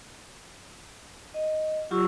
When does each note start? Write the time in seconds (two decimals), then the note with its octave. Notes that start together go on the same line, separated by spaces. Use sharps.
1.34 D#5
1.91 F#3 F4 G4 C#6 E6